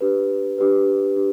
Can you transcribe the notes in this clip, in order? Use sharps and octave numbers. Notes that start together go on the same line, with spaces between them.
D4 G4 B4
D4 G4 B4
D4 G4